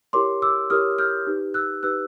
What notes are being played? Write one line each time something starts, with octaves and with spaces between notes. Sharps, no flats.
E4 G4 A#4 C#5 C6 D6
D6 E6
E4 G4 A#4 C#5 D#6 F6
F6 G6
D#4 G4 B4
E6 F#6
D#4 G4 B4 E6 F#6